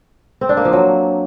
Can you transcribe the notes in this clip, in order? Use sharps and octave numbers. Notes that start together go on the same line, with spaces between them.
C4
D4
A#3
F3
F#3